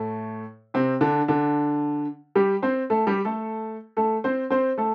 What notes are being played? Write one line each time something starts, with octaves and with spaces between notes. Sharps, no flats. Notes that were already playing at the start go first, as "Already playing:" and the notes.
Already playing: A2 A3
C3 C4
D3 D4
D3 D4
G3 G4
C4 C5
A3 A4
G3 G4
A3 A4
A3 A4
C4 C5
C4 C5
A3 A4